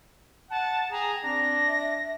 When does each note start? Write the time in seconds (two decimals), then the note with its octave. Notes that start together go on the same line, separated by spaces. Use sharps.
0.50 F#5 A5
0.91 G#4 G5 A#5
1.24 C4 D4 A#6
1.67 E5